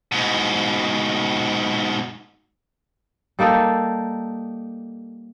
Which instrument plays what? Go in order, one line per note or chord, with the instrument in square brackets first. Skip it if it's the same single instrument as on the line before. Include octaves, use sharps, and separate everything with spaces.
[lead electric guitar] G#2 B2
[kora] G3 A#3 D#4 A4